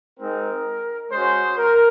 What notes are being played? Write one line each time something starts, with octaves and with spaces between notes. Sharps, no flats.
G#3 C4 D#4 A#4
G#3 C#4 F#4 C5
A#4